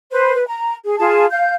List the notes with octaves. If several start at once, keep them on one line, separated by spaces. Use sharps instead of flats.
B4 C5
B4
A#5
G#4
F4 G#4 A5
F5 G6